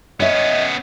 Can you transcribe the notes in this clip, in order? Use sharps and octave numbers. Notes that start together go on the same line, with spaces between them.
B3 C#4 C#5 D#5 E5